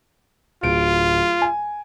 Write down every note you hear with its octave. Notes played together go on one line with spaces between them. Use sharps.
D1 F4 D7
G#5